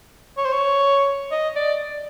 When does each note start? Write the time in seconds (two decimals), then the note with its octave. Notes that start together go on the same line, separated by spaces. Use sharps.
0.38 C#5
0.45 C5
0.52 C#5
1.32 D#5
1.56 D5